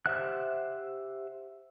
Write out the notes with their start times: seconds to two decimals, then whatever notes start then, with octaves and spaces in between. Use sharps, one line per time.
0.06 G4 C5 E5 F#5 F#6